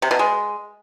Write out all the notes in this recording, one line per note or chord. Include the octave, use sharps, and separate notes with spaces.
C3
B2
G#3